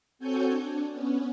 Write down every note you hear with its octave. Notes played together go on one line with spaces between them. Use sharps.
C4 F#4 A4 C#5 G#5 G6
D4
B3 C#4